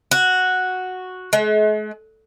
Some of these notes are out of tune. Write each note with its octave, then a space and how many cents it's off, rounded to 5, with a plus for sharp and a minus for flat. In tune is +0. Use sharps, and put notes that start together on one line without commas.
F#4 -5
G#3 +45